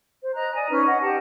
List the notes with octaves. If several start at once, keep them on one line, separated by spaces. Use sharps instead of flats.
C5
D#5 A#5 F#6
D5 G#5 D#6
C#4 D#4 B4 F6
D#5 F#5
G4 F#5 A5